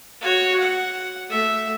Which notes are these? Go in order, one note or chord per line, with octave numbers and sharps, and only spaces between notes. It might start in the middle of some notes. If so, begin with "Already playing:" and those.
F#4 C#5
F#5
A3 E5